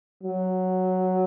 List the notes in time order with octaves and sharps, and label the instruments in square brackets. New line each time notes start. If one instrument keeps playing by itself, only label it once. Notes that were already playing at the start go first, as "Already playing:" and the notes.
[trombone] F#3